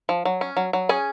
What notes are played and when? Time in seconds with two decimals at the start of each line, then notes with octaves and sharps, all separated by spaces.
0.09 F3
0.25 F#3
0.41 C#4
0.57 F#3
0.73 F#3
0.89 C#4 G#4 G#5